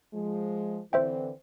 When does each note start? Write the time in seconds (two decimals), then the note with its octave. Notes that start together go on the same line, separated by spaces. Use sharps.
0.14 F3 G#3
0.93 D3 E3 C4 C5 E5 G5